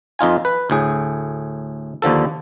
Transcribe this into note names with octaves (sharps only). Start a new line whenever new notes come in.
F2 D#4 F4 G#5
B4
D2 A2 G#4
D#2 D3 F3 A4